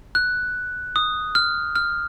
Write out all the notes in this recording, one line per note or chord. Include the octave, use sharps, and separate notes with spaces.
F#6
D#6
F6
F6